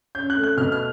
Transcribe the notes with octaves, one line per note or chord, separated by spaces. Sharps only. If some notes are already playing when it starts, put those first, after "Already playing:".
C#4 G6
F#6
A3
F#6
B2 F6
F6